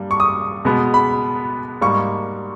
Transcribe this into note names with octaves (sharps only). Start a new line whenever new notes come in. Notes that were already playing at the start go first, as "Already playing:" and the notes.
Already playing: G2 G3 A#3
C#6
D#6
B2 G#3 B3
B5
G#2 G3 A#3 C#6